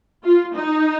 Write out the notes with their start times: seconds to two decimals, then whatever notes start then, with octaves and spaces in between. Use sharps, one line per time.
0.24 F4
0.54 D#4